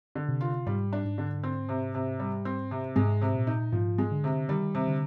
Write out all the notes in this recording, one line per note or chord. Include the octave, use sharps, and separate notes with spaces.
D3
C3
F4
G#2 G3
D4
G#2
D3
C4
C3
C3
G3
C4
C3
G#2 G#3
C3
A#2
D#4
G#2 F3
G#3
D3
C3
D#3 G3
C3
D3